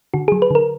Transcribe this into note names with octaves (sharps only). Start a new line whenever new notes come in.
D3 F#4
F#3 G#4
B4
D3 A#4